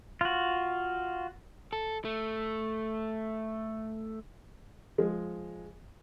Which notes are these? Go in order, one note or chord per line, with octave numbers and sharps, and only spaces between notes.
F4 F#4
A4
A3
F3 G#3